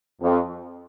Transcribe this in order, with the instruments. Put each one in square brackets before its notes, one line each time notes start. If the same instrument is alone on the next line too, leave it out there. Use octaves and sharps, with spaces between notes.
[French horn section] F2